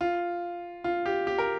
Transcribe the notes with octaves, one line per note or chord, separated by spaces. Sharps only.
F4
F4
G4
G4
A#4